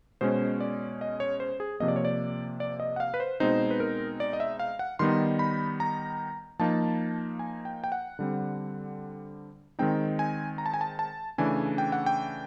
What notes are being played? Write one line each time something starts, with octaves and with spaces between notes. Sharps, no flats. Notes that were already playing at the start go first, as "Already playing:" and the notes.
B2 G#3 C#4 C5
D5
D#5
C#5
C5
G#4
C3 F3 A#3 D#5
D5
C#5
D5
D5
D#5
F#5
F5
B4
C5
B2 G#3 C4 D#4 C5
B4
A#4
D5
D#5
E5
F5
F#5
D#3 G3 B3 D#4 C6
B5
A#5
F3 A#3 D#4 A5
G#5
G5
G5
F#5
D3 G3 C4
D#3 G#3 C4 D#4 G5
G#5
A#5
A5
G#5
A5
A5
C#3 E3 A3 D4 G#5
G5
F#5
G5